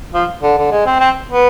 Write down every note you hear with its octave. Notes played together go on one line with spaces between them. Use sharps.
F3
D3
D3
G#3
C4
C4
B3